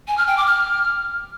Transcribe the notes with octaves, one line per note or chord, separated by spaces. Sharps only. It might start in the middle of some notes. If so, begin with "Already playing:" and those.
G#5
F6
G5
D6
F6